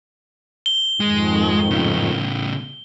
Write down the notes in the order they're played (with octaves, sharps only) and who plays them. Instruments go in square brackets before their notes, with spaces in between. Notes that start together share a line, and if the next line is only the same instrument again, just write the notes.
[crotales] G7
[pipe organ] F2 G#2 D#3 [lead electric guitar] G#3
[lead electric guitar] A2 C#3